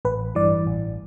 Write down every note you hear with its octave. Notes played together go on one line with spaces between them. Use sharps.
A1 B4
G2 E3 D5
A1